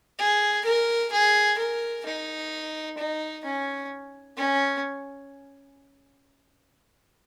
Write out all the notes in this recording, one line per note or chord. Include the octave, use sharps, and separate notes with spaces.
G#4
A#4
G#4
A#4
D#4
D#4
C#4
C#4